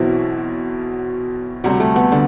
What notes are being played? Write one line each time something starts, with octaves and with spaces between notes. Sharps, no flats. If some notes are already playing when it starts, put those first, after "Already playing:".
Already playing: B1 B2 E3 F#3 C4 E4
D2 C3 F#3 G3
A3
B3
D3